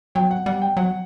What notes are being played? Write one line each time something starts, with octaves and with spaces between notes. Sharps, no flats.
F#3 G5
F#5
G3 F#5
G5
F#3 F#5